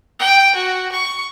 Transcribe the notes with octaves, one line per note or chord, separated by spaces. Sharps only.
G5
F#4
C#6